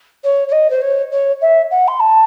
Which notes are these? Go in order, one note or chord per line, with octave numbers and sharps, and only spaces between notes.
C#5
C#5
D#5
C5
C#5
C#5
E5
F#5
C6
A5